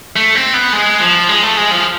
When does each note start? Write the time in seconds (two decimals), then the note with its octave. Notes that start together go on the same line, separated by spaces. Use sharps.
0.16 A3
0.35 C4
0.54 B3
0.73 G#3
1.00 F3
1.29 G#3
1.43 A3
1.57 G#3
1.71 F3